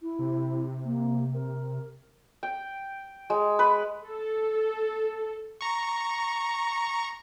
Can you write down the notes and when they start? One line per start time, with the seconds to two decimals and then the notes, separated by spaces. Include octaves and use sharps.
0.02 E4
0.19 C3
0.84 A#3
1.34 A#4
2.43 G5
3.30 G#3
3.59 B4
4.05 A4
5.61 A#5 C#6